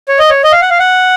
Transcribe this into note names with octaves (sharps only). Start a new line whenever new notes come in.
C#5
D#5
C#5
D#5
F5
F#5
F5
F#5